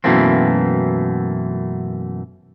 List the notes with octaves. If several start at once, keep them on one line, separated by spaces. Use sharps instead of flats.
F#2 B2 E3 A3 A#3 C4